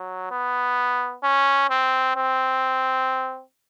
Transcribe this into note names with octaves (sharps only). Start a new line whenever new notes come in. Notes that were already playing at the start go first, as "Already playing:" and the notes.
Already playing: F#3
B3
C#4
C4
C4